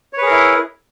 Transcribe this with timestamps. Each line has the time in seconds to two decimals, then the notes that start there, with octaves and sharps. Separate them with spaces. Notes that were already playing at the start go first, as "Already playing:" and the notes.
0.13 C#5
0.17 B4
0.22 G#4
0.26 A#4
0.31 E4